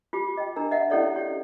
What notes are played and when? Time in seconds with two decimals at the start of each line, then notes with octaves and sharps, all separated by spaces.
0.13 F4 G4 D6
0.37 D#5 G5
0.56 D4 A#4 A#5
0.71 D#5 E5 F#5
0.90 C#4 E4 G4 A4 C#5 D5
1.16 G4 C#5